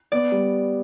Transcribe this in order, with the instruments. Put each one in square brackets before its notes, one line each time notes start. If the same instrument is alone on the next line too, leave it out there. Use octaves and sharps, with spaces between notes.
[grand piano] B3 [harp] D5
[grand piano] G3